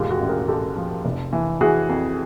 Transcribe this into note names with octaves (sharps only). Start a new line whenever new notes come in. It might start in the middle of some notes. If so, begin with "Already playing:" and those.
Already playing: E1 D#2 G#2 F4 G4
F#4 G#4
A1
G#4 A#4
A1 G4 A4
F3
F1
E3
E3 F#4 G#4
F2